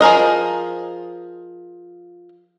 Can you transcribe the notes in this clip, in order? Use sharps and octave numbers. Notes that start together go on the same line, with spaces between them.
F3 G#4 A#4 D#5